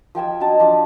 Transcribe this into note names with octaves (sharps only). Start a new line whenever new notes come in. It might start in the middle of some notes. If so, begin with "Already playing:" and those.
F3 G5 G#5 E6
F#3 D4 D#5 A5
F3 D4